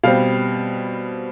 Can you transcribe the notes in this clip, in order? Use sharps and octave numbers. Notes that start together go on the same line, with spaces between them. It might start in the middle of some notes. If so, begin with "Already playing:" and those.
B2 G3 C4 F5